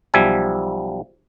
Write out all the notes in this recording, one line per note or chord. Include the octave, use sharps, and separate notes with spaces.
B1 F3 G3 E5 G#5